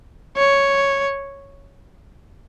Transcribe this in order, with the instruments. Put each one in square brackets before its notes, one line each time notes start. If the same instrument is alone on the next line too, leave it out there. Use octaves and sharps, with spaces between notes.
[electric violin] C#5